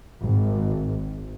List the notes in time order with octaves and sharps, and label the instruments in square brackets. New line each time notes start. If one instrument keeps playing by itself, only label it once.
[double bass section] G#1